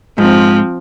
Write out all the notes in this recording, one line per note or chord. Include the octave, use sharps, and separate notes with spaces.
G#2 F3 C4